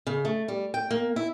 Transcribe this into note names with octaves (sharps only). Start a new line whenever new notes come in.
C#3
A3
G3
G5
A#3
E4